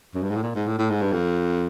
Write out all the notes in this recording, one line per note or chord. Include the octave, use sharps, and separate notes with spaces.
F#2
G2
G#2
A2
A#2
G#2
A2
A2
G#2
G2
F2